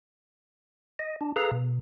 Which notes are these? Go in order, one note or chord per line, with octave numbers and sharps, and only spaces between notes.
D#5
D4
G#4 A4 B4 F5 A#5
B2